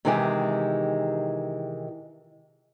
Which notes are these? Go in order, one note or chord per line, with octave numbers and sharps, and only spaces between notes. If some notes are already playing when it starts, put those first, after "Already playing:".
C3 D#3 E3 G#3 G4 G#4